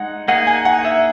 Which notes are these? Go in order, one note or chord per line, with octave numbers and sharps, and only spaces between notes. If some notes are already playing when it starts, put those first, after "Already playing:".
Already playing: G#3 D#4 F#5
A#3 D#4 G#4 F#5
G#5
F#5
E5